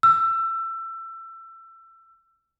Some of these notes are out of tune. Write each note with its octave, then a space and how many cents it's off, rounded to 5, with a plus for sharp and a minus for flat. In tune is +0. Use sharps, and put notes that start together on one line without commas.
E6 +25